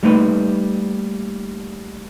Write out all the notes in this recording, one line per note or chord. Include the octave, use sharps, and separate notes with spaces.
G3 A3 A#3 D#4 B4